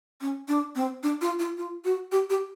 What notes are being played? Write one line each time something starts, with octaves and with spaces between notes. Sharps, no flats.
C#4
D4
C4
D4
F4
F4
F4
F#4
G4
G4